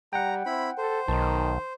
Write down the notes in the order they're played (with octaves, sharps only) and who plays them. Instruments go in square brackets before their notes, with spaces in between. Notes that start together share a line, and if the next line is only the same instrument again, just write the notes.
[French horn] G3 [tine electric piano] F#5 G5 [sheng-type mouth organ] A#5
[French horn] C4 [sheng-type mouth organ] E4 B5
[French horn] A4 [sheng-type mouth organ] C5
[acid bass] B1 [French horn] D#3 [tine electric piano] A5